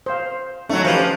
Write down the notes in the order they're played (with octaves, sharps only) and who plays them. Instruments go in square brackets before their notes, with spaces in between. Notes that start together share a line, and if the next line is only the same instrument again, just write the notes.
[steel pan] C5 F5
[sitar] F#3 A3 [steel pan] C#4 D#4
[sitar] F3 [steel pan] G4 B4 F5